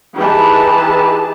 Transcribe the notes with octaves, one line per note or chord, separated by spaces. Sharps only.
E3 D#4 G4 G#4 B4 A5